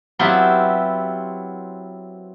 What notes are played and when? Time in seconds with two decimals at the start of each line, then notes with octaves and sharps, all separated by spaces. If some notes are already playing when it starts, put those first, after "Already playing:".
0.19 F#3 B3 C4 E4 F4 G4